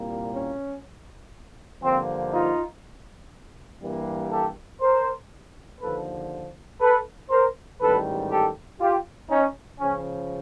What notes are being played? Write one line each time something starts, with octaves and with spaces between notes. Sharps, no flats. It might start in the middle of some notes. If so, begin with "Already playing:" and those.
Already playing: C2 A#2 G3 A#3
C#4
G2 D3 F3 A#3 C4
D#4 F4
G2 E3 G3 A#3
G4 A4
A#4 C5
D#2 D3 F3 A4 B4
A4 B4
A#4 C5
A1 G#2 D#3 G3 A4 B4
G4 A4
F4 G4
C#4 D#4
C#2 C#3 F3 C#4